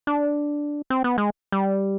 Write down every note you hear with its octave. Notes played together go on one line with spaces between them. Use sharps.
D4
C4
B3
G#3
G3